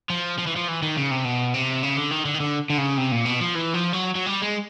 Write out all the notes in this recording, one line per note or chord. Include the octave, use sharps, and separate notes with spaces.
F3
F3
E3
F3
E3
D#3
C#3
C3
B2
C3
C#3
D3
D#3
D3
D#3
D3
D3
C#3
C3
A#2
B2
F3
E3
F3
F#3
F#3
G3
G#3